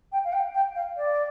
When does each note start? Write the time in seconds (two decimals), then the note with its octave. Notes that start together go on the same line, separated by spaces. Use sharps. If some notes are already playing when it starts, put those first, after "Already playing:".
0.12 G5
0.24 F5
0.33 G5
0.54 G5
0.75 F5
0.97 D5